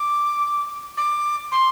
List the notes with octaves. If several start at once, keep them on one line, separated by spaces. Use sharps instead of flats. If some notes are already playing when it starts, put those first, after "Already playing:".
Already playing: D6
D6
C6